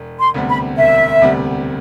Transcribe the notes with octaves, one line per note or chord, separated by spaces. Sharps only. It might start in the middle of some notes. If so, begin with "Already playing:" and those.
Already playing: E1
C6
D2 C3 G3 B3
B5
E1 E5
D2 C3 G3 B3